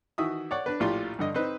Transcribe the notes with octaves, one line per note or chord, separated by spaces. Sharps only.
D#3 E3 F#4 E5 D#6
C#5 D5 F#5
D4 B4
A#1 A2 F4 G4 C6
G2 D3 D#5
C4 D#4 B4